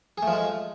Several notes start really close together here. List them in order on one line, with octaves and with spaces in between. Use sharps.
G#4 A3 F3 G#3